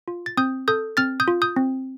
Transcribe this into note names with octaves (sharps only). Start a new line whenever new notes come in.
F4
A6
C4 D#6 G6
A4 D#6 G6
C4 F6 A6
D#6 G6
F4
D#6 G6
C4